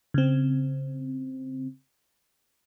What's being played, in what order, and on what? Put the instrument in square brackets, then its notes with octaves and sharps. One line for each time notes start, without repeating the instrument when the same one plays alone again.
[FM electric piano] C#3 C4